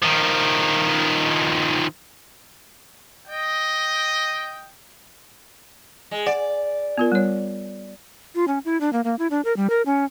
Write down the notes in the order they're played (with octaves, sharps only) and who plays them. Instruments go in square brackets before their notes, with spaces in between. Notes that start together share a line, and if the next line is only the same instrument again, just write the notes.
[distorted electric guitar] D#3 F3
[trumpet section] D#5 G5
[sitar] G#3
[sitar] D5 [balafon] F#5
[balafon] B3 F4 A#4
G3 C#5
[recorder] F4
C#4
E4
D4
A#3
A#3
E4
D4
A#4
G3
A#4
C#4